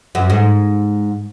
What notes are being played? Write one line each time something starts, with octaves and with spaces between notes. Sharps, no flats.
F#2
G#2